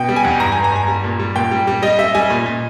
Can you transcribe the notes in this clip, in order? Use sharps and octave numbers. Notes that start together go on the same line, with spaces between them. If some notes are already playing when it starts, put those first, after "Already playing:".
Already playing: B2 G5
G3
G#5
E2
G2 A#5
G#5
G2
A#5
G2 G#5
G3
A#2
G3
A#2 G5
G3
G3
G3 D#5
G3 E5
G3 G#5
A#2
A#2